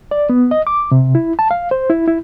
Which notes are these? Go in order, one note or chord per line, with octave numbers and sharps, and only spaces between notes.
D5
B3
D#5
D6
C3
E4
A5
F5
C5
E4
E4